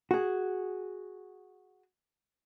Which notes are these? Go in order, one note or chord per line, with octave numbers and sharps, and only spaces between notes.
F#4 G#4